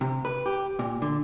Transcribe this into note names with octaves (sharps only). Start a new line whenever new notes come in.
C3
B4
G4
A#2
D3